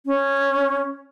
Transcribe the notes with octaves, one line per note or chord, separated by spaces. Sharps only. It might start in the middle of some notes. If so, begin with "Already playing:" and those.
C#4